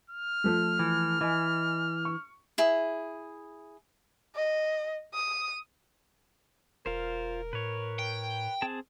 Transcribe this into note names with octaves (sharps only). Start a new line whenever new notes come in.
F6
F3 A3
E3
E3 D#5 G#5
C#6
E4 G#4
D#5
D#6
E1 F4 A#4 C5
A2 B4 C#5
G5
C4 G#4 A5